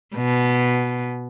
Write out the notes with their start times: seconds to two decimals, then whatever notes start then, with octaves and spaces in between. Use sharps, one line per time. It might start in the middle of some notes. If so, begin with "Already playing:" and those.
0.15 B2